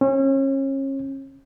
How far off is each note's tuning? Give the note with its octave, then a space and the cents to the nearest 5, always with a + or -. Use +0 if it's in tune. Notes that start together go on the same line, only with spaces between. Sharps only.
C#4 -35